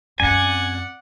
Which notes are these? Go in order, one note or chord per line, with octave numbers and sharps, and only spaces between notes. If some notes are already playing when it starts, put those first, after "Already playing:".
F#2 C4 D5 F#5 G#5